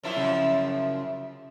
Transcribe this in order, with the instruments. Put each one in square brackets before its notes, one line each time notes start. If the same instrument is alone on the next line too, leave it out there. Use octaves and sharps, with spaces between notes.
[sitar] F#2 F3 E4
[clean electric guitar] C#3